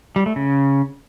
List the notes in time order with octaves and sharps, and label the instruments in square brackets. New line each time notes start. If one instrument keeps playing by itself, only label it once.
[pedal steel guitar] G3
A3
C#3